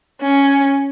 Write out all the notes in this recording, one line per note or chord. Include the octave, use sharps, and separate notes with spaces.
C#4